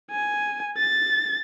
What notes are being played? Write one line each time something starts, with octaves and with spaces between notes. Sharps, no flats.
G#5
A6